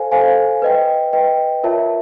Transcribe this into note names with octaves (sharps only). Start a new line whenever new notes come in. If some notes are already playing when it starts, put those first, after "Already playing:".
Already playing: A4 C5 F5 G#5
A4 C5 F5 G#5
B4 D#5 G5
B4 D#5 G5
F4 A#4 C#5 E5 A5